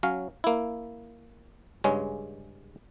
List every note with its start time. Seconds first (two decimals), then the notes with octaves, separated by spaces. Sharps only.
0.03 F#3 C#4 F5
0.44 A#3 E4
1.84 G2 C#3 G#3 C#4